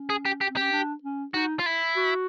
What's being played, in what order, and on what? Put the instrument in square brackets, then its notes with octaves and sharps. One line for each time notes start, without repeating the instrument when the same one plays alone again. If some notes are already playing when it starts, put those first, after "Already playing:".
Already playing: [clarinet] C#4
[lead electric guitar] G#4
G4
G4
[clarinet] C4
[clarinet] C#4 [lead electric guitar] G4
[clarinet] D4
C#4
[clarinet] D#4 [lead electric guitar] F#4
[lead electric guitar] F4
E4
[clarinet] F#4